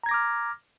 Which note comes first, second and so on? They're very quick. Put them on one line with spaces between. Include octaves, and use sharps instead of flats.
A#5 G#6 A#6 D6 F6